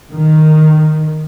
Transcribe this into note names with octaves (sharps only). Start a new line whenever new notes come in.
D#3